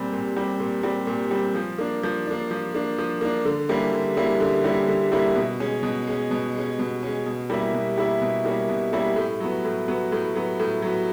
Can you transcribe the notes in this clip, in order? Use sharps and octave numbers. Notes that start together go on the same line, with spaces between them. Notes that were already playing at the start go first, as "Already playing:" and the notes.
Already playing: A#2 G3 C4
A#2
G3 C4
A#2
G3 C4
A#2
G3 C4
F3
A#3 D4
F3
A#3 D4
F3
A#3 D4
F3
A#3 D4
D3
G3 A#3 C#4 E4
D3
G3 A#3 C#4 E4
D3
G3 A#3 C#4 E4
D3
G3 A#3 C#4 E4
B2
G#3 C#4
B2
G#3 C#4
B2
G#3 C#4
B2
G#3 C#4
B2
G3 A#3 C#4 E4
B2
G3 A#3 C#4 E4
B2
G3 A#3 C#4 E4
B2
G3 A#3 C#4 E4
A2
F#3 B3
A2
F#3 B3
A2
F#3 B3
A2
F#3 B3